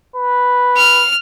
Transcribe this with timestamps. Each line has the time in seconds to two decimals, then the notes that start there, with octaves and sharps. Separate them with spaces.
0.16 B4
0.77 F6